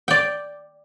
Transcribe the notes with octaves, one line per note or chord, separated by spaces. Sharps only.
D5 G5